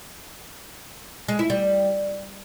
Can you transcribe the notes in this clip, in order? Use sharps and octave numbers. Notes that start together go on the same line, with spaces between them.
G#3
E4
G3